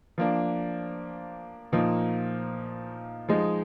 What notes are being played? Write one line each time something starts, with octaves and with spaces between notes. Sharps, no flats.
F3 A#3 D4
A#2 F3 A#3 D#4
F3 G#3 D#4